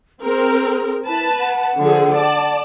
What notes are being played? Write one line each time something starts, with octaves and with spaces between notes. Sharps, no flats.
C4 G#4 A#4
E4 B4 A5
F#5
D3 F3 G#4
D5 A5